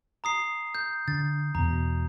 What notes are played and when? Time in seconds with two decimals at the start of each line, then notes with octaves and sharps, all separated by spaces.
0.24 A#5 D#6 C7
0.75 G6
1.08 D3 A6
1.55 E2 B2 A#5